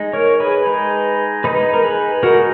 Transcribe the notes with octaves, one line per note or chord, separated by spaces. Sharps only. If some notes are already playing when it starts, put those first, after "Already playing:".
Already playing: G#3 D#4
A#4 C#5
G#4 B4
G#3 D#4
G#3 D#4 B4 D#5
A#4
G#4 B4
G#3 D#4 F#4 A#4